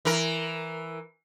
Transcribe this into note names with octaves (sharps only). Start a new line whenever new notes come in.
E3 A#4